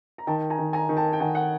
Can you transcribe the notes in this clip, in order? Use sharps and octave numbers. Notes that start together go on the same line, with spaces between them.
A#5
D#3 G5 A5
G#5 A#5
D#3
G#5 A#5
D#3
G5 A5
G5
D#3 F#5 G#5
F#5